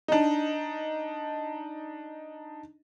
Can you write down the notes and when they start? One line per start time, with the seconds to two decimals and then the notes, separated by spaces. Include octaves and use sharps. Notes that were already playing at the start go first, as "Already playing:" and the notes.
0.08 D4 D#4